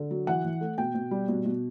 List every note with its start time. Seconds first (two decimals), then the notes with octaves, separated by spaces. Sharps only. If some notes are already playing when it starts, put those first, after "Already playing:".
Already playing: D3
0.11 F#3
0.27 E3 F#5
0.44 E3
0.61 A3
0.78 B2 G5
0.95 B2
1.11 G3
1.28 B2
1.45 B2